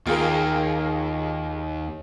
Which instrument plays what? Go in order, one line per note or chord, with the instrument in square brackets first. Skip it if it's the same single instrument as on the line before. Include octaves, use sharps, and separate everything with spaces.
[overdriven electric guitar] D#2 [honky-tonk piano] F4 G#4 A#4